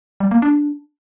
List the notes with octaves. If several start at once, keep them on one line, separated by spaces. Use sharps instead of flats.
G3
A#3
D4